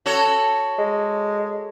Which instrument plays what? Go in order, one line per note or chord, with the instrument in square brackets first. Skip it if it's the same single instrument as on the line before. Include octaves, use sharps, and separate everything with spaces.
[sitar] F#4 A4 C#5
[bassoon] G#3